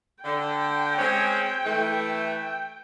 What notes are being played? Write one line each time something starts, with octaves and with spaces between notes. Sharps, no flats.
D3 G5
G#3 C4 C#4
E3 A3